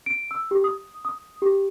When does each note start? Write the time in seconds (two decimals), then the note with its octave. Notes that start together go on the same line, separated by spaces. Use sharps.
0.06 D7
0.31 E6
0.51 G4
0.64 D#6
1.05 D#6
1.42 G4